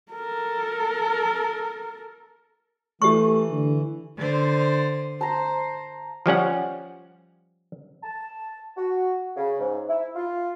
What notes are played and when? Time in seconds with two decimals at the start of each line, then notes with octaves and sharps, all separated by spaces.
0.12 A4 A#4
3.02 E3 A3 G4 C#6
3.51 D3
4.17 D3 C5
5.21 C5 A5 A#5
6.26 F3 G3 C#4 F#5
8.03 A5
8.77 F#4
9.36 C#3
9.60 G#2
9.89 E4
10.16 F4